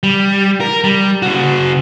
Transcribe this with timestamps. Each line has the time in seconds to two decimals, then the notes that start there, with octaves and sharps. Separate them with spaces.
0.03 G3
0.60 A#4
0.84 G3
1.22 C#3 F#4